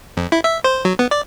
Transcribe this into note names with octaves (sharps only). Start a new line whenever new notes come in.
F2
E4
E5
C5
F#3
B3
D5